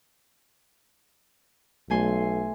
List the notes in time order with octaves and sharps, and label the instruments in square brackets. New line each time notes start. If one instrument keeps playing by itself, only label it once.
[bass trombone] B1 [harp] A3 G#5 C6